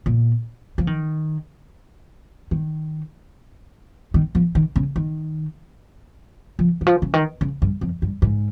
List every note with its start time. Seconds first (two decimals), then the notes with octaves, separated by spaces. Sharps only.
0.06 A#2
0.78 F3
0.87 D#3
2.51 D#3
4.14 D#3
4.35 F3
4.55 D#3
4.76 C#3
4.96 D#3
6.59 F3
6.81 D#3
6.87 F3
7.02 C#3
7.14 D#3
7.41 C#3
7.62 G2
7.81 F2
8.02 G2
8.22 G#2